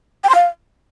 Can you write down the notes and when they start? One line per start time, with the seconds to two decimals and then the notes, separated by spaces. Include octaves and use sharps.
0.24 G5
0.29 C6
0.35 F5